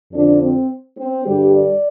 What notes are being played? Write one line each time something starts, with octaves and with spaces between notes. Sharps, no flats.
F2 D3 F3 D4
C4
C4
G2 D3 G3 G4
D5